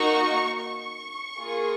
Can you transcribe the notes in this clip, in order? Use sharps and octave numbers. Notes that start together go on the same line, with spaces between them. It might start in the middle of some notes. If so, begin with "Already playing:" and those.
Already playing: A#3 D#4 F#4 C#6
C#6
A#3 F4 G#4